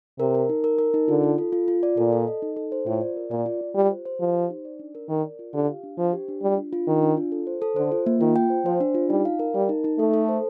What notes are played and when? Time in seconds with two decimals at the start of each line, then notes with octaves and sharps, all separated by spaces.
0.19 C3 A#4
0.35 A#4
0.49 D#4
0.64 A#4
0.78 A#4
0.94 D#4
1.08 D3 F4
1.24 F4
1.38 A4
1.53 F4
1.68 F4
1.83 D5
1.97 A#2 A4
2.12 A4
2.27 D#5
2.42 D#4
2.56 A4
2.72 C5
2.86 A2 F4
3.01 D5
3.16 A#4
3.31 A#2 D5
3.46 F4
3.61 F4
3.75 G3 G4
3.91 C5
4.05 C5
4.20 F3 G4
4.35 C5
4.50 D#4
4.65 D5
4.79 D4
4.95 A#4
5.09 D#3 A#4
5.24 D5
5.39 F4
5.54 D3 G4
5.68 F5
5.83 D4
5.98 F3 C5
6.13 G4
6.28 D4
6.43 G3 F4
6.58 D4
6.73 F4
6.87 D#3 D4
7.02 D4
7.17 F4
7.32 A4
7.47 C5
7.62 A4
7.76 D3 C5
7.92 F4
8.06 A#3
8.21 D#3 F4
8.36 G5
8.50 C5
8.65 F3 C5
8.80 D4
8.95 F4
9.10 G3 D#4
9.25 F5
9.39 A#4
9.54 G3 A#4
9.69 D#4
9.84 D#4
9.98 A3 A4
10.14 A4
10.29 C5